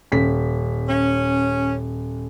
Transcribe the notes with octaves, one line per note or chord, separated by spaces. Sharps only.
D#1 B6
C#4